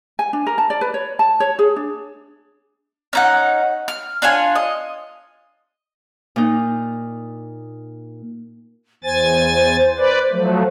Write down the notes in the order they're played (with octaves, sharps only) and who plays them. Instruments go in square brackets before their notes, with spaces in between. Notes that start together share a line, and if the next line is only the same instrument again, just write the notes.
[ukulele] G#5
D4
A#4
A5
D5
B4
C#5
A5
C#5
G#4
D4
[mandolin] C#4 D#4 F#5
F6
D4 F4 C#5 G#5
D#5
[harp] A#2 D#4
[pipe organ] E2 G#5 A6 [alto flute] C5
[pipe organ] B4 D5
F3 F#3 A3